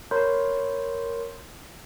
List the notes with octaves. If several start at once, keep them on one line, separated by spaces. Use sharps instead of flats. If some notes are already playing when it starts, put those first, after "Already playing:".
A#4 C#5 B5 C6 G6